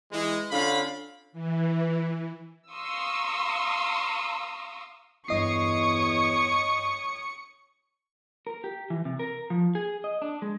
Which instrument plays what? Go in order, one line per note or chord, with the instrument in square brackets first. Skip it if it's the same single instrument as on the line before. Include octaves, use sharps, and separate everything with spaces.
[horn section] E3 G#3
D3 C#4 F4 F5 B5
[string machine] E3
[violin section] F5 A#5 C6 C#6 D#6 E6
[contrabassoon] E2 [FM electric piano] G2 D#5 C7 [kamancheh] C#5 D#6 [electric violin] C#6 C#7
[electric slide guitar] A#4
G4
E3
C3
A#4
F3
G#4
D#5
D4
G#3